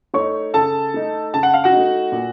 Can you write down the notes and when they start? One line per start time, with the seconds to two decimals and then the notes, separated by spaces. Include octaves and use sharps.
0.14 A3 D#4 C#5 C#6
0.54 C#3 A4 A5
0.94 A3 D#4
1.34 C#3 A5
1.43 F#5
1.54 F5
1.64 F#4 F#5
1.72 A3 D#4
2.12 A#2